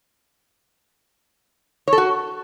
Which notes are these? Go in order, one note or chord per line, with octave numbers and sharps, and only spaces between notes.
C#5
A4
F#4